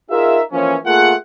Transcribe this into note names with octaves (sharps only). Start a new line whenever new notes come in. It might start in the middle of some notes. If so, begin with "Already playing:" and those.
D#4 F4 G#4 A#4 E5
E3 F3 A#3 C#4
A3 A#3 F4 G#4 F#5